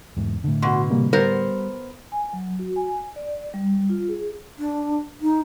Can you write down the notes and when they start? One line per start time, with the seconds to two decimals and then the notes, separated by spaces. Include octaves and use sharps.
0.17 E2 G#2
0.44 A2 D3
0.62 B2 F#4 F#5 C6
0.90 C3 G3 A#3
1.13 G3 B3 A#4 C5
2.12 G#5
2.33 F#3
2.59 F#4
2.76 G#5
3.16 D5
3.54 G3
3.89 F4
4.09 G#4
4.58 D4
5.21 D#4